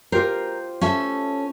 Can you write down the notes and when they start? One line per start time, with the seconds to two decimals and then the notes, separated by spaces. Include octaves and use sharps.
0.12 F4 G4 A#4 C5
0.81 C#4 A4 E5